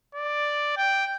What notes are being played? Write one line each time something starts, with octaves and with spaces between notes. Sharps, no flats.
D5
G5